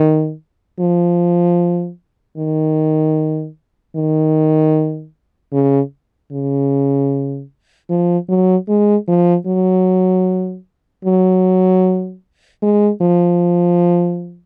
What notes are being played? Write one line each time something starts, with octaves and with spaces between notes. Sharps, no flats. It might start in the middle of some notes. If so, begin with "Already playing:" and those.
Already playing: D#3
F3
D#3
D#3
C#3
C#3
F3
F#3
G#3
F3
F#3
F#3
G#3
F3